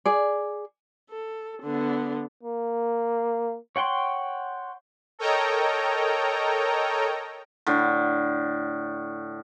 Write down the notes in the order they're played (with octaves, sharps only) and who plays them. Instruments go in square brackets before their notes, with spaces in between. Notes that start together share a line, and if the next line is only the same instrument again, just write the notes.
[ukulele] G#4 D5
[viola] A4
D3 B3
[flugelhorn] A#3
[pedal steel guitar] C#5 F#5 G5 C6
[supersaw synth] A4 A#4 C#5 D#5 G5 A#5
[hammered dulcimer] A2 D3